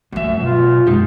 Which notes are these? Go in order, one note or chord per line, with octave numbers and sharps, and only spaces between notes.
F#2 E3 A3 E5
B2 F4
F#2 D3 G#3 D#4 G4